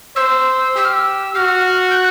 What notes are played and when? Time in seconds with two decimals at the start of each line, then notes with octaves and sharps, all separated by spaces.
0.16 C5 E6
0.76 G4 E6
0.85 F6
0.94 E6
1.35 F#4 F6
1.91 G6
1.95 F#6